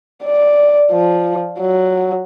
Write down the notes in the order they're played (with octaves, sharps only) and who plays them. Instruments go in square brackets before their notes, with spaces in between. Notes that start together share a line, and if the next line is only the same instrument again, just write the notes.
[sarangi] D5
F3
F#3